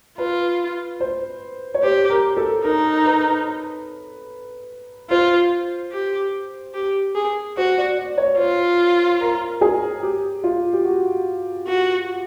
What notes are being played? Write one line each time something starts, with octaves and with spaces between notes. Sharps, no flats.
F4 B4
C5
C#5
G4 C5
A#4
A4
D#4 A#4
B4
F4 C5
G4
G4
G#4
F#4 C5
D5
D5
C#5
F4 C5
A#4
G#4
G4
F4
G4
F#4
F#4